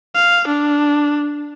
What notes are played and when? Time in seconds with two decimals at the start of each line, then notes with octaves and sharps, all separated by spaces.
0.15 F5
0.47 D4